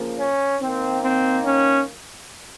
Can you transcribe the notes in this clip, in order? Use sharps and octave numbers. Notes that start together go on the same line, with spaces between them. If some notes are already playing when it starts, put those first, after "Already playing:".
Already playing: C#3 F3 A#3
C#4
D#3 A#3 C4
C4
C#4